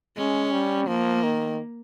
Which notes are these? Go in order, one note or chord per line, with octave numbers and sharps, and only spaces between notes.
G#3 C#4
G3
F3 A#3
D#3